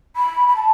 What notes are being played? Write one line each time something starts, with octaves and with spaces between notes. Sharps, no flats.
B5
B5
A5